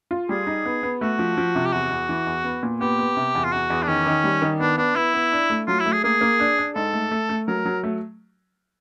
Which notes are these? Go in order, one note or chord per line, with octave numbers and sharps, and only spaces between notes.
F4
G3 G#4
D#4
B3
B3
A3 F#4
F3
F3
C3
G4
E2 F#4
E2
E3
E2
B3
A#2
B3 G4
B3
C3
E2
F4
E2 F#4
E2
D4
D#3 C#4
D#3
G3
D#3
B3 D4
B3 D4
B3 E4
B3
D4
A3
F#3 F4
E4
A3
G#4
A#3 G#4
A#3
D4
D4
G#2 A4
A3
A3
A3
F#3 A#4
F#3
A3